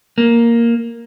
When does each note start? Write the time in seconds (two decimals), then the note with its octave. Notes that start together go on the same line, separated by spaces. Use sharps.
0.18 A#3